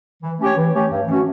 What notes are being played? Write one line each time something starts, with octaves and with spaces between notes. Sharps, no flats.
E3
A3 C#4 G4 C#5
E3
A3 C#4 G4 C#5
G2
E3 A3 C#4 F#4